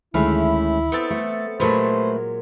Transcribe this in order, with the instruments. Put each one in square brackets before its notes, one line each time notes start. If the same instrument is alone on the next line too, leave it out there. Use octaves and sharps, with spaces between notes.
[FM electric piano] D2 D#3 B5 [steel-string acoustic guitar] G#3 A3 C#4 [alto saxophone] E4 [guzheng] F5
[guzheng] B3 C4 A4 [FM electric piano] A6 C#7
[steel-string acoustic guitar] A3
[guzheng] A#2 F#3 G#3 [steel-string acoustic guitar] A3 B4 [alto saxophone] C5